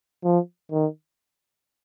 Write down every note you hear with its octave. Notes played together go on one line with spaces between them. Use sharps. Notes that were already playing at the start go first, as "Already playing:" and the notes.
F3
D#3